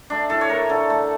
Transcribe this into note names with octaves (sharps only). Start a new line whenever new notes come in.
A3 D4
A2 A4
C#5
A2 A#4
D3 A4
A3